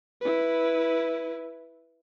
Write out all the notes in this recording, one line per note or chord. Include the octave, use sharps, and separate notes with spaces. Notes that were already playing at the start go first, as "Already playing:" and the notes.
E4 B4